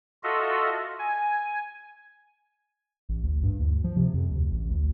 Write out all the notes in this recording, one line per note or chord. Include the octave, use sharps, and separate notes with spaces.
F4 F#4 A4 D#5 E5
G#5
A1
D2
G2
D2
F3
C3
F2
D2
A1
D2